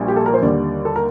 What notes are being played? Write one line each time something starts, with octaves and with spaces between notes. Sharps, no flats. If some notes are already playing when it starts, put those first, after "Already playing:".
Already playing: A#1 A#2 G3
G4
A4
A#4
C5
D#2 D3 G3 D5
A4
A#4